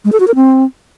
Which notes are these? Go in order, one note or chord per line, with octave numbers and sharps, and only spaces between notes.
G#3
A4
F#4
A#4
C4